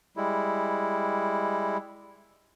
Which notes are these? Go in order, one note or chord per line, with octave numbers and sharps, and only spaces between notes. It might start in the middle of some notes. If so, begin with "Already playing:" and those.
G3 G#3 E4